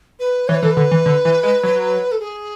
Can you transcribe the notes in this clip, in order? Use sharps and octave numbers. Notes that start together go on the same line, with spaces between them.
B4
E3 C#5
B4
E3 A4
B4
D3
E3
D3
E3
G#3
F#3
A4
G#4